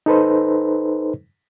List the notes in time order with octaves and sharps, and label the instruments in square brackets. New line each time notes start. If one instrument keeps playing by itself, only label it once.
[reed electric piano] D#4 A4 B4 C5